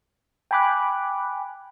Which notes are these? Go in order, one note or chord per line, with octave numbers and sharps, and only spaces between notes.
G5 G#5 B5 D6 F#6